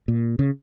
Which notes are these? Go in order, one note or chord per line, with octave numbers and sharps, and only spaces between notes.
A#2
C#3